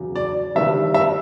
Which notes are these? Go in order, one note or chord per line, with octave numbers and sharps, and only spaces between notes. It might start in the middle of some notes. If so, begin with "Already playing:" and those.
Already playing: E2 C#3 F#3
D5
G1 G2 D#3 G3 E5
E5